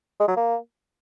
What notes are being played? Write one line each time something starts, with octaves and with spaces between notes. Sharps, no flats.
G#3
F#3
A#3